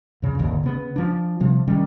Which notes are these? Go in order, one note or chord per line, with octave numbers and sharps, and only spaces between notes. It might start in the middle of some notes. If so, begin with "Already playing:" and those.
F2 C#3
D#1 G#1 D#2 D3
C#3 B3
F3 D4
C3 F3 G3
D#3 G3 C#4